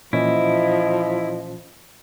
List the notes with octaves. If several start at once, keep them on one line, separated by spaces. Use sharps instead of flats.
A#2 E3 F3 C#4 E4 D#5